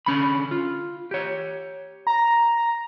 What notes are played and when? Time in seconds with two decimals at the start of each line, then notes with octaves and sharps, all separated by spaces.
0.06 D3 C#4 B5
0.51 F4
1.11 G4 C#5
2.07 A#5